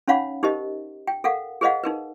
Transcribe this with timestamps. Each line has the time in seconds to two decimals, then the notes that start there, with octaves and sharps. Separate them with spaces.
0.08 C#4 D#4 C#5 F5 F#5 B5
0.43 D#4 G4 A#4 C5 D#5
1.07 G5
1.24 A4 A#4 F5 F#5
1.61 G#4 A#4 C5 D#5 F5 F#5
1.84 D#4 A#4 B4